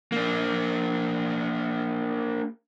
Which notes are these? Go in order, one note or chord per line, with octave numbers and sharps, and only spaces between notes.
A#3 D4